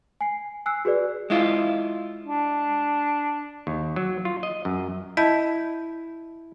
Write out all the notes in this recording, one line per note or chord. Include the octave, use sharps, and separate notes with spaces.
G#5 C7
G#5 E6 F#6 C7
F#4 G#4 B4 D5
G#3 E4 F4
D4
D#2
F#3
F4
D#5
F#2
E4 D#5 A5 G6